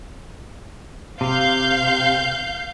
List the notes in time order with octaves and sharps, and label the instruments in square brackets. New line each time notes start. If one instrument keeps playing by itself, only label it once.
[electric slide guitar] C3 [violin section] F5 G6